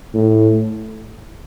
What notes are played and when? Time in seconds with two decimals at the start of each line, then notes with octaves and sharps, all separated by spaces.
0.14 A2